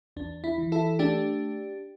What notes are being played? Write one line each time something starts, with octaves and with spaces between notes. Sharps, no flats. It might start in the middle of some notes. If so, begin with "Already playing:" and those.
E2 D4
E4
E3
E4 A4
A3 D4 G4